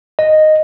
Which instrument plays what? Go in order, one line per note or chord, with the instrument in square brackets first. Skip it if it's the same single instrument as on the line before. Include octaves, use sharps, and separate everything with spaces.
[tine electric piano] D#5